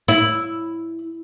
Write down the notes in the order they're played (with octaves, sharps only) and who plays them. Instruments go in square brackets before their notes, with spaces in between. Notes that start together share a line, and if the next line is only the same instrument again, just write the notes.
[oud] E4